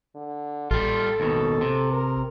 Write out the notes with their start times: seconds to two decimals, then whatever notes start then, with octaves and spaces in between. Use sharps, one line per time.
0.15 D3
0.71 A1 G3 F4 A4
1.20 D#2 B2
1.61 C3
1.93 A#4